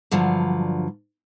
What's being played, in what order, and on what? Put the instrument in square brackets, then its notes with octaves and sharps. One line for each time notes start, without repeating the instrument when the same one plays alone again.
[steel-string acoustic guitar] G2 D3 F3 F#3